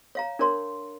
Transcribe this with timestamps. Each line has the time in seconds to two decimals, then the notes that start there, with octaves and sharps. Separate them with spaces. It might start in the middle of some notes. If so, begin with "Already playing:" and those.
0.15 C#5 F5 A#5
0.39 D4 A#4 C#5 C6